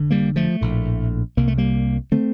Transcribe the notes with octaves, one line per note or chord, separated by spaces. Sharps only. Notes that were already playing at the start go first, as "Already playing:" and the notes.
Already playing: F1 D3
G3 A#3
F3 A3
A#1 A2
C2 C3 A#3
A3
G3 A#3
D3 A3 C4